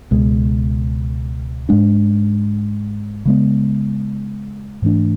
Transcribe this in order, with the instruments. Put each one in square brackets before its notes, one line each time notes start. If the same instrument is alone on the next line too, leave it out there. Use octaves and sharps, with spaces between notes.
[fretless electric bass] C#2 B2 G#3
G#2 G#3 D4
C#3 G#3 B3
G#2 E3 A3 D4